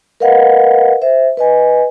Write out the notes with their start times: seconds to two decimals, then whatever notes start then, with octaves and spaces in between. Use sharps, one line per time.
0.20 A#4 B4 D#5 F5 F#5
1.02 C5 E5
1.37 B4 D#5 G#5